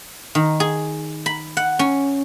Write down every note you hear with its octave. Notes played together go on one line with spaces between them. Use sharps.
D#3
G#4
B5
F#5
C#4